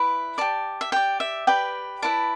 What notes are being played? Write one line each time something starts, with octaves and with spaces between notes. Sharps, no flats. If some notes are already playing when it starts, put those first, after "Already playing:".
Already playing: E4 B4 D5 B5
G4 D5 A5
E5
G4 D5 G5
E5
G4 B4 D5 G5
E4 B4 D5 A5